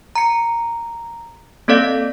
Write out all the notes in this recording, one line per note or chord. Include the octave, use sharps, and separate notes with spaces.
A#5 C#7
A#3 C4 A4 D5 F5